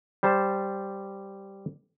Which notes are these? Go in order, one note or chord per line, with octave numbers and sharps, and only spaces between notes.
G3 C5 A5